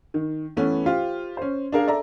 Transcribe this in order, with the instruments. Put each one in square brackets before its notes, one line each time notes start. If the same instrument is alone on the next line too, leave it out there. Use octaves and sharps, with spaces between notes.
[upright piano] D#3
E3 A3 B3 C#4 B4
F4 G4 C5 F5
C#4 C5
D4 G#4 A#4 F5
A4 D5 E5 A#5